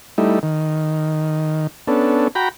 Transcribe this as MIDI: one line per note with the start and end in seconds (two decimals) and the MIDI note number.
0.18 0.39 55
0.18 0.39 57
0.18 0.39 63
0.18 0.39 64
0.43 1.67 51
1.88 2.28 59
1.88 2.28 61
1.88 2.28 62
1.88 2.28 69
2.35 2.49 66
2.35 2.49 79
2.35 2.49 82
2.35 2.49 83